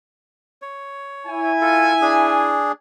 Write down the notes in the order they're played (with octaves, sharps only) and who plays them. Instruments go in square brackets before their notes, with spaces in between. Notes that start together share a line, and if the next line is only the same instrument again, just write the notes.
[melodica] C#5
[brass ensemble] E4 G#5
[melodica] F4 A4
D4 G#4